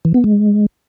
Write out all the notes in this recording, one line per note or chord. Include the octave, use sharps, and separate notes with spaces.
E3
B3
G#3